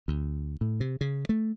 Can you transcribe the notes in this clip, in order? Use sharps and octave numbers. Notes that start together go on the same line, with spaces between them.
D2
A2
C3
C#3
A3